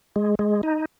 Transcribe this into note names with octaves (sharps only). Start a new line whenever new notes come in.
G#3
G#3
D#4